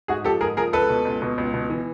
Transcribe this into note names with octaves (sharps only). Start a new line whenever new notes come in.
G#2 F#4 G#4
F3 G4 A4
G#2 G#4 A#4
F3 G#4 A#4
C#2 A4 B4
B2
C#2
B2
C#2
B2
E3